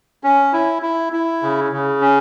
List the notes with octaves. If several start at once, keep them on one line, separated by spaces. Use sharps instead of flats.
C#4
E4
E4
E4
C#3
C#3
C#4